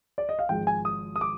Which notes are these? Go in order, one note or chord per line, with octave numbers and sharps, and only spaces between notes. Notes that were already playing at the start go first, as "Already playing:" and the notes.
D5
D#5
F5
G#1 G#2 F3 G#3 G5
G#5
D#6
D#6
D6